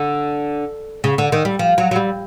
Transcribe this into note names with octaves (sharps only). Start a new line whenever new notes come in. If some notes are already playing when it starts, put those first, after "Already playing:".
Already playing: D3
C#3
D3
D#3
G3
F3
F#3
F#3
G3